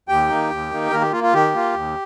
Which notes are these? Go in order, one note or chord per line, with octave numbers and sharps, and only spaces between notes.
D#2 G4 G5
D#3 A#3 D#4
D#2
D#3 A#3 D#4
D#3 A#3 A#4
G4
A#3 F4
F4
D#3 G4
A#3 F4
D#2